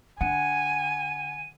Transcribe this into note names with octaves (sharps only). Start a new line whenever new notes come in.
D3 F#5 G#5 D#7